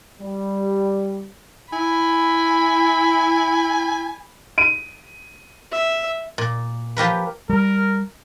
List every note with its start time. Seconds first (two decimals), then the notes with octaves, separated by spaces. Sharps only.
0.21 G3
1.73 E4 G#5 B5
4.58 D7 D#7
5.72 E5
6.38 A#2
6.97 F3 G4 A#4 B4
7.50 G3 A#4